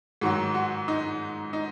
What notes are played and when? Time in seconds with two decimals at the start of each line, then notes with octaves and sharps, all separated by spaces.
0.21 G#2 D#3 F#3 F#4
0.54 F#4
0.88 D#4
1.53 D#4